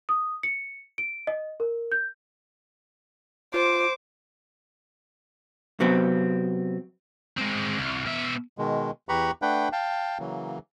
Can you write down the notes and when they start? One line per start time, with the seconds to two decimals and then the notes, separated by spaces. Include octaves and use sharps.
0.09 D#6
0.43 C#7
0.98 D7
1.27 D#5
1.60 A#4
1.92 G6
3.54 F4 C5 D6
5.80 C3 F#3 B3 C4
7.37 G#3 C4
7.78 C2
8.06 B2 E5
8.58 B2 D#3 G#3
9.09 E2 G4 B4 A#5 B5 C#6
9.42 A3 D4 B4 F#5 G5
9.72 F5 G5 A5
10.19 C#3 E3 F#3 A#3